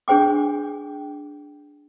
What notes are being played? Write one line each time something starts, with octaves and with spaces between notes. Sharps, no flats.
D4 G#4 C5 G5 D6